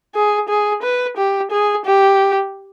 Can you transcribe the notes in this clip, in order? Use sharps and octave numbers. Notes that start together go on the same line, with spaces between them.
G#4
G#4
B4
G4
G#4
G4